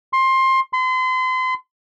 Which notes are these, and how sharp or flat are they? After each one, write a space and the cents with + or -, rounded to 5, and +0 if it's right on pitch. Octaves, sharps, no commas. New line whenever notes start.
C6 +20
C6 -35